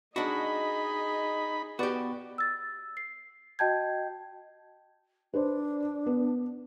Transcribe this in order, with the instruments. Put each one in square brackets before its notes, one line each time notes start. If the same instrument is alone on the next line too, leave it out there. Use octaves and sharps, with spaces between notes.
[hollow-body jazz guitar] D4 F#4 [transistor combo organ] D#4 B5 [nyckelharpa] G#4 D#5
[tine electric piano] B3 B4 D5 [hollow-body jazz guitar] F#4 G4
[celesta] E6 A6
C7
F#4 D#5 G5 A5 G6 G#6
[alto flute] D4 [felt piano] B4 C5
[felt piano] B3